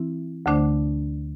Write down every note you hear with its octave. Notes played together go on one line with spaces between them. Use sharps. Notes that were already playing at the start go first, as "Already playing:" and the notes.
Already playing: E3 C4 E4
D2 D3 A3 D4 C5